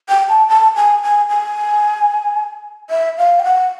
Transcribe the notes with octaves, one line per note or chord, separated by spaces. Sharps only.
G5
A5
A5
G#5
G#5
G#5
E5
F5
G5
F#5